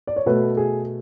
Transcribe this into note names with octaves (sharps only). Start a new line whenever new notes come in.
D5
C#5
B2 A3 B4
G#4